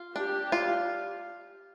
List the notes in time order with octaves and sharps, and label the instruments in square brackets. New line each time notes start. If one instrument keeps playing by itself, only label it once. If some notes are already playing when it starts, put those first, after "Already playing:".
Already playing: [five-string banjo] F4
[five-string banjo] D4 [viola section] G4
[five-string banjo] F4